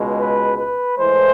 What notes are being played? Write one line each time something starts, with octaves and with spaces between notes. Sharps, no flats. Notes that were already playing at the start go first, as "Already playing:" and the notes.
Already playing: C#2 B2 G#3
B4
B4
A2 E3 G#3 C5